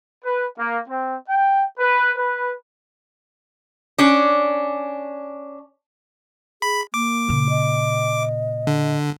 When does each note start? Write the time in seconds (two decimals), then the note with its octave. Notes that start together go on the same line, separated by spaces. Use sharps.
0.23 B4
0.57 A#3
0.88 C4
1.29 G5
1.79 B4
2.17 B4
3.98 C#4 D4
6.62 G#4 B5
6.94 A#3 D6
7.29 A#2 C#3
7.50 D#5
8.67 D3